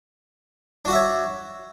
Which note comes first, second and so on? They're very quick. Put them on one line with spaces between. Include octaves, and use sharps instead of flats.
D4 F#4 F#5 E5 C#5